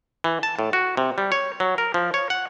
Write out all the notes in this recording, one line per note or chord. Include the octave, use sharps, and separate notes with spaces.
E3
A5
A2
F#4
C3
G3
C#5
F#3
A#4
F3
C#5
F#5